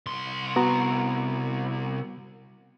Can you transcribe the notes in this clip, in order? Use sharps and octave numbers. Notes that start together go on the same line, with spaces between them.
C2 C6
B3 F#4 A#5